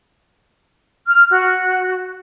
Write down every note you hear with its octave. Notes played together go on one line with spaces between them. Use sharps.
F6
F#4